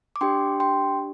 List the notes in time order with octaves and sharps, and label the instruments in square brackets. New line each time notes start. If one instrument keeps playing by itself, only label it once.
[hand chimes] D6
D4 G4 G5 C6
G5 C6